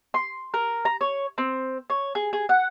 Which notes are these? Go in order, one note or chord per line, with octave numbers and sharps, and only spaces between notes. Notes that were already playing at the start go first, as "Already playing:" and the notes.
C6
A#4
A#5
C#5
C4
C#5
G#4
G#4
F#5